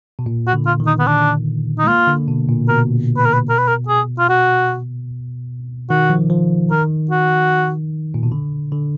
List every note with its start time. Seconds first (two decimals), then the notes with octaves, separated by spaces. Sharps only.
0.19 B2
0.26 A#2
0.47 F#4
0.54 D3
0.66 F4
0.80 D#3
0.86 D#4
0.99 B3
1.07 D4
1.79 D#4
1.84 G#3
1.87 A#3 F4
2.08 D3
2.28 B2
2.49 A#2
2.68 B2 A#4
3.17 B4
3.25 A#4
3.33 B4
3.49 A#4
3.58 B4
3.68 A#4
3.89 G#4
4.19 F4
4.29 F#4
5.90 D#3 F#4
6.10 F3
6.30 F3
6.70 D#3 A#4
7.11 F#4
8.14 A#2
8.23 B2
8.32 D3
8.72 D3